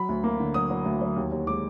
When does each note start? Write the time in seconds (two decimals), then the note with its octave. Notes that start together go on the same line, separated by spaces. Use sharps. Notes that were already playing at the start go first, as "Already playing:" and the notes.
Already playing: F#3 B5
0.09 D2
0.24 A#3
0.40 D3
0.54 F#3 D#6
0.70 F#3
0.86 D2
1.01 F#3
1.16 D#2
1.32 D#2
1.47 G#3 D6